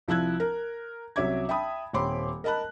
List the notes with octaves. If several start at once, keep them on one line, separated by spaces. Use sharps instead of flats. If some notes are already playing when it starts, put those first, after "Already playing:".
C2 F3 E4 E6 F#6 G#6
A#4
C2 F#3 C#4 E5 D6 G#6
E5 G5 A5 B5 D#6
D#1 C4 C#5 B5 C6 D6
A#4 D#5 A5 B5 F#6